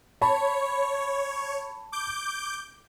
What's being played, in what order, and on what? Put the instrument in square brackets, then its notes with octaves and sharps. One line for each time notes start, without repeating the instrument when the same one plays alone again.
[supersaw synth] C#5 [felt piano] A5 B5
[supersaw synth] D6 G6